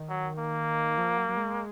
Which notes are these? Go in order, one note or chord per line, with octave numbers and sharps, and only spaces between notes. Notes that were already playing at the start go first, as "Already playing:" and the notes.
Already playing: D#3
F#3
A#3
F3
F#3
F#3
G#3